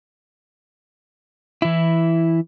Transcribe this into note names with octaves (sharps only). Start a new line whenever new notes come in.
E3 E4